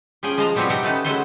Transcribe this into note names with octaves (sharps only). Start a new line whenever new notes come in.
F3 C#4 G#4 G5
F3 G#3 C5 D#5 A5 A#5
B2 F3 G3 C4 B4 C#5
G3 C4 D#4 G4 E5 F#5
D#3 A3 C#4 D#4 B4 A5
F#3 G#3 C#4 A4 B4 C5